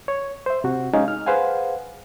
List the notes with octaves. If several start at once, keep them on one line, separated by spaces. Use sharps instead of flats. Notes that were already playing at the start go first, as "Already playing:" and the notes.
C#5
C5 E5
C3 F#4
G#3 C#4 D#4 F5 G#5
F6
G#4 B4 C5 F5 F#5 G#5